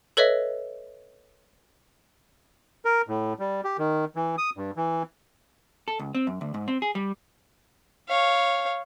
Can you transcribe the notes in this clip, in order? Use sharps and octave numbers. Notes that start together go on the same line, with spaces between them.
A4 B4 C#5 D#5 E5
A#4
A2
G3
G4
D#3
E3
D#6
G2
E3
A4
C#2
C4
F#2
D2
G#2
C4
G#4
G3
C#5 F5